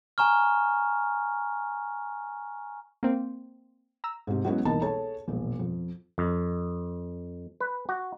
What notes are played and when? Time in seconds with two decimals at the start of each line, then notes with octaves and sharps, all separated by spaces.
0.18 G#5 A#5 C#6 F6
3.03 A#3 C4
4.04 A#5 E6
4.27 G#2 C3
4.45 F#3 G#3 B3 C#4 E4 F#4
4.65 E1 C2 E3 A#3 D#4 A5
4.81 G#4 A4 C#5 A5
5.28 E1 A#1
5.59 F2
6.18 F2
7.61 B4
7.89 F#4